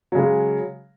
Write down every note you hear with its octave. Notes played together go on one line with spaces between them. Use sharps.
C#3 F#3 G#3